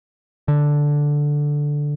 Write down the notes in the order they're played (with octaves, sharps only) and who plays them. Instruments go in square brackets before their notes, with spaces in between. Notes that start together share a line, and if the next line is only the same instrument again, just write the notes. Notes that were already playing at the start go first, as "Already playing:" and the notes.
[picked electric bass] D3